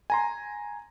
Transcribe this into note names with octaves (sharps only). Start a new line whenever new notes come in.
G#5 A#5 C6